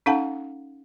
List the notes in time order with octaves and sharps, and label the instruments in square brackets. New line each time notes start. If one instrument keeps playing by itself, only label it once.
[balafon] C#4 D#4 A4 F5 F#5 A5